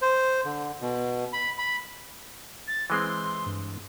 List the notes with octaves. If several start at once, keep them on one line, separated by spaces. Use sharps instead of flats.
C5
D3
B2
B5
B5
A6
E3 G#3 C4 C6
G2